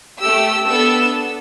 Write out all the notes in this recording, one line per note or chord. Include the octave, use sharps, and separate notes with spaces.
A3 G4 E6
B3 D4 A4 E6